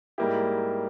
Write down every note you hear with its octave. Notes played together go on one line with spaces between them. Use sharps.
G#2 G3 A#3 E4 G4